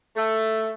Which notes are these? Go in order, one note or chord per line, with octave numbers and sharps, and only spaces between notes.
A3